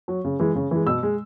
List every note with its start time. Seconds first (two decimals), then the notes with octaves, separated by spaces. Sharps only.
0.08 F#3
0.25 C#3
0.39 E3 G#3
0.56 C#3
0.71 E3 G#3
0.87 B2 E6
1.03 G#3